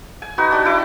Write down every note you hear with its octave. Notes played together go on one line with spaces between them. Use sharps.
G#5
D#4 F#4 B4
D4 F#4
E4 D6